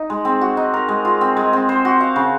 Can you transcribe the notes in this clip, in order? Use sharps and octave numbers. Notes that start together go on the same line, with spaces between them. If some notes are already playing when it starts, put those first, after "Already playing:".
Already playing: D#4
G#3
C4
F#4
D#4
A#4
G#3
F4
C4
G#3
C4
C5
F#4
F5
C#3